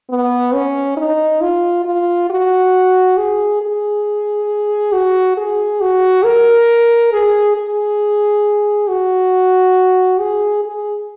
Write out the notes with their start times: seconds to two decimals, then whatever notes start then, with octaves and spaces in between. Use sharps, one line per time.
0.10 B3
0.54 C#4
0.97 D#4
1.41 F4
1.85 F4
2.30 F#4
3.18 G#4
3.62 G#4
4.93 F#4
5.37 G#4
5.81 F#4
6.24 A#4
7.13 G#4
7.56 G#4
8.89 F#4
10.20 G#4
10.64 G#4